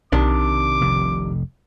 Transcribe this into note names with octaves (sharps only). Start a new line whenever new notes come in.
B1 C3 D#3 D4 D6
F1 F2